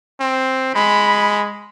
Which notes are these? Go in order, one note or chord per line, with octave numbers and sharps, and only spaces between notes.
C4
G#3 B5